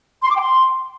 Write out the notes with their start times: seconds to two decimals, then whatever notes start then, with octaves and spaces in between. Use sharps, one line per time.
0.24 C6
0.29 D6
0.34 G5
0.40 C6